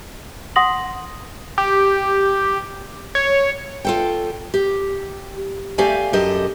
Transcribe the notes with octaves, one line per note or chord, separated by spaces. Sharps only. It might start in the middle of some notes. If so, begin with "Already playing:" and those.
F#5 C6 D#6 A#6 F#7
G4
C#5
F4 A4 G5
G4
A3 G4 D5 F5 G#5
F#2 G4 A4 D#5